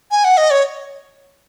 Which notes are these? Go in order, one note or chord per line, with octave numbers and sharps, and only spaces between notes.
G#5
F#5
D#5
C#5